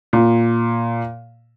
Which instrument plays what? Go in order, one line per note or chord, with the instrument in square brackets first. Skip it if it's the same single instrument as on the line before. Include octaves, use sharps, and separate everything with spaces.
[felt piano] A#2